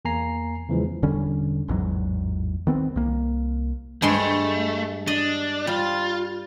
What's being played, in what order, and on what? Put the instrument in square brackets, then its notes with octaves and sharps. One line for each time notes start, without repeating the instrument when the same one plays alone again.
[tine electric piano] E2 A#3 G#5 A#5 C7
E2 C#3 E3 F3 G#3
[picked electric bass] E1 D3 G3 C#4
A1 E2 G#2 F#3
D#3 B3 C4
C2 A#3
[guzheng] G2 G#3 C6 [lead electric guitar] A3
[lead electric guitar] D4 [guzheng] D#5
[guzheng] G3 [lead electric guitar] F4